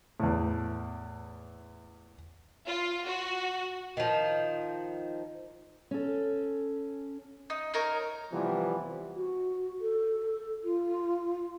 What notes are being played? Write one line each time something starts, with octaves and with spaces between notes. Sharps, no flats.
E2 A2
F4
F#4
D#3 F3
C#4 A4
D#4
D#4 A#4 C#5
C3 E3 F3 G3 B3 C4
F#4
A4
F4